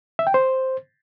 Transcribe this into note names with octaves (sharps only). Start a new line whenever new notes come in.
E5
G5
C5